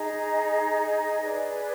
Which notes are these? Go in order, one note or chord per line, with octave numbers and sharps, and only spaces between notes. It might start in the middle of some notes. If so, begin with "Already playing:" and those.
Already playing: D#4 G#4 D#5 A#5
G#4 B4 D5